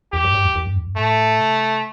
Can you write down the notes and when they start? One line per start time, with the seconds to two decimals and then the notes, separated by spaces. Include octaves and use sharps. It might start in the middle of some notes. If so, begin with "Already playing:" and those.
0.13 E2 G4
0.24 G2
0.34 G2
0.44 E2
0.55 E2
0.66 G2
0.76 E2
0.87 G2
0.97 A2 A3
1.39 C3